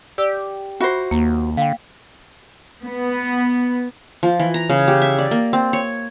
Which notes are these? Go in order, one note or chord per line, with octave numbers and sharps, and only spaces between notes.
G4 D5 E6
F4 F#4 C5 E5 B5
D#2 A#3
D3 F5 G5
B3
F3
E3
A#5
C#3
G4
E5
D5
A#3
C4
C#5